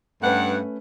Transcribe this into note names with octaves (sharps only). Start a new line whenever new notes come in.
G2 A3 C#4 B4 F#5